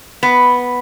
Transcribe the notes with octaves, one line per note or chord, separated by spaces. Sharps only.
B3